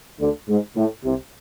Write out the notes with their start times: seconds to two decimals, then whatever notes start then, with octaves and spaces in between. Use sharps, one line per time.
0.20 D2 D3
0.49 G#2
0.76 A2
1.04 C2 C3